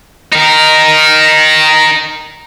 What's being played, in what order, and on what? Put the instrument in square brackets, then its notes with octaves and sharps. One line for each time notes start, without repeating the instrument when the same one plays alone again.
[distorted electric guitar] D#4 A#4